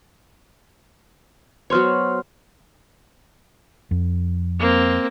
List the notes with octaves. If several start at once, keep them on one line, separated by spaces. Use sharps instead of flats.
F#3 B3 C5 C#5 C6 F6
F2
A#3 C4